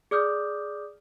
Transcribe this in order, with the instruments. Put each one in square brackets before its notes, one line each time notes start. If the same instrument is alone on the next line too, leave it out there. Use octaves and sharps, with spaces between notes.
[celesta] G#4 D5 D6 D#6 F6 G6